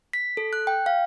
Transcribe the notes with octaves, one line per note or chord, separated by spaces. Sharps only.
B6
A4
F#6
G5
F5